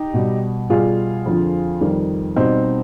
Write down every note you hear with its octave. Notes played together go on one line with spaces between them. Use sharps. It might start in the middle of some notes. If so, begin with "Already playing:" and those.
Already playing: D#4 G4
B2 G3
B2 G3 F4 G#4
F2 D3 F3
F2 D#3 G3
B2 G3 C4 D#4